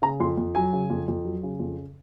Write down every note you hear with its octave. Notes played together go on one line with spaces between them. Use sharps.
C#3 A#5
F2 C6
F2
F#3 G#5
C#3
F2
F2
F#3
C#3
F2